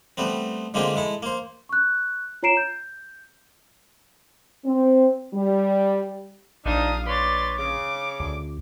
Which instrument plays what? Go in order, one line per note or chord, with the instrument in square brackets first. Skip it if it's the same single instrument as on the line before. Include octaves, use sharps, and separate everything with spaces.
[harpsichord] G3 A3 B3 C4
D3 G#3 A#3 C4 F4 G4
G#3 E4 A4
A#3 C5
[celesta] C#6 F#6
F4 C#5 A#5 C7 D7 E7
G6
[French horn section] C4
G3
[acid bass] A#1 [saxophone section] D4 D#4 [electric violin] F5 D#6
[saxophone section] B4 C#5 D5 [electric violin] C6 A6
[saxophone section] C#3 [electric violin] D6
[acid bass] D2